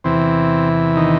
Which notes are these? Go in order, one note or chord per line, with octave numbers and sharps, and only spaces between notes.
E2 C3 E3 C4
D#3 D#4